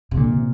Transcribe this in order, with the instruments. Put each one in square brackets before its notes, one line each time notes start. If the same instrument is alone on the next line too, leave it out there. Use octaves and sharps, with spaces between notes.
[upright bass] C3
[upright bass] A#2 [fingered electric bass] D3
[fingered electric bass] C3